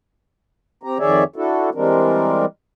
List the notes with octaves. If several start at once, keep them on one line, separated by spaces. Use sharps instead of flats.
C4 G4 A#5
F2 D#3 G#4 C#5 D5 E5
D4 E4 F#4 A4
E3 G3 G#3 C4 D4 A#4